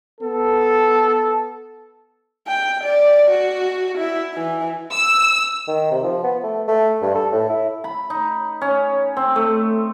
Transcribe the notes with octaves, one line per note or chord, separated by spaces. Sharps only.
B3 A4
G5
D5
F#4
E4
E3
E6
D#3
C3
F3
B3
A3
A3
G2
A4
A2
E4
B5
D#4
C#4
C4
A3